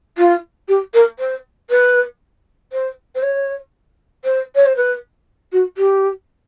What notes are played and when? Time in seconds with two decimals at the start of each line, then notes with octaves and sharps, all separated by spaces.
0.17 F4
0.68 G4
0.93 A#4
1.19 C5
1.70 B4
2.72 C5
3.15 C5
3.22 C#5
4.24 C5
4.55 C#5
4.65 C5
4.76 B4
5.52 F#4
5.77 G4